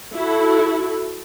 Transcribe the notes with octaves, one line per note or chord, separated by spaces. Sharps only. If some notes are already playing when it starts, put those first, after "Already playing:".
E4 F#4 A4